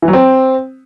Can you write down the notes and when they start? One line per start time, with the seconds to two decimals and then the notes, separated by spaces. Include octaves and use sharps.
0.02 E3
0.08 F#3
0.13 C4